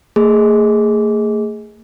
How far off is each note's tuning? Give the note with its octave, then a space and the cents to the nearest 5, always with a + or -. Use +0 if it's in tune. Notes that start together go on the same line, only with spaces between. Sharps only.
A3 +45 G#4 +0